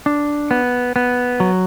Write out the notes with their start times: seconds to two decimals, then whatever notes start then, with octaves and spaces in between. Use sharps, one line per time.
0.06 D4
0.51 B3
0.96 B3
1.40 F#3